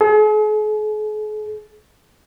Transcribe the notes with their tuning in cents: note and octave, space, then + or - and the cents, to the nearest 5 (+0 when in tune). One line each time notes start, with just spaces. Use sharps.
G#4 +45